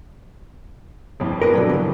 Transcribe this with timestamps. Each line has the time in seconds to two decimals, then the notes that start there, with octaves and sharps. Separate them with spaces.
1.20 G1 F2 A2
1.42 A#4 B4
1.54 B2 D3 F#3
1.69 C#3 F#3